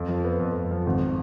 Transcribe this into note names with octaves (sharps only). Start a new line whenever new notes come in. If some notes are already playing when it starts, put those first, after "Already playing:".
Already playing: F2
F3
B3
F2
F2
F3
G#1